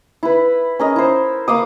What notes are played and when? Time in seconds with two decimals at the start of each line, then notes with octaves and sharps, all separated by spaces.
0.23 E4 B4
0.79 C#4 A#4 D#5
0.96 E4 C5
1.48 A#3 F5 D6 D#6